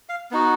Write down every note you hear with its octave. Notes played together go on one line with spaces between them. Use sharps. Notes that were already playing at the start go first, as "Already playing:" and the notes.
F5
B3 D#4 F#4